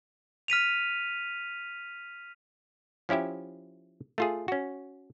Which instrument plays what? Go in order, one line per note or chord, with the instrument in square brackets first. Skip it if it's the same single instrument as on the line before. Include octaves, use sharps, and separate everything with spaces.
[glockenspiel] F6 B6 D#7 F7
[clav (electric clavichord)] F3 C#4 E4 G4 E5
A3 F4 G#4
C#4 F#4